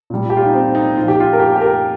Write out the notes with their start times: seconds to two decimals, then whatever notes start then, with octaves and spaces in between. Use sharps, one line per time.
0.10 A#2 G3
0.30 G4
0.37 F4
0.45 D#4
0.53 C4
0.75 D#4
0.97 A#2 F3 F4
1.08 G4
1.20 F4
1.33 A#4
1.39 G4
1.56 G4
1.61 A#4